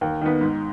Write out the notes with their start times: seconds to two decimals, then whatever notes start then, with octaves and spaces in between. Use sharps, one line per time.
0.01 D#2
0.21 D#3 B3
0.41 G#2